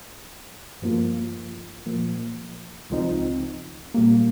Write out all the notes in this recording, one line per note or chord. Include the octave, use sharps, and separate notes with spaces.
G2 F3 A#3 F4
A#2 F3 A#3
C#2 C#3 F3 C4 D#4
A#2 G3 A#3